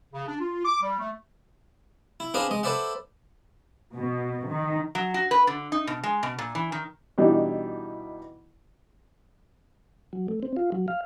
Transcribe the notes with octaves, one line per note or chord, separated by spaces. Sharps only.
C#3
D4
F4
D6
G3
A3
E4
C4 D4 G#4 B4 D#5 F5
G#3 D#5
A4 B4 C5 D5 E5 F#5
B2
D#3
F#3
F#4
B4
D3
D#4
B2
G#3
B2
A#2
E3
D#3
B2 E3 G3 D4 D#4
F#3
A3
C4
F4
F#3
F5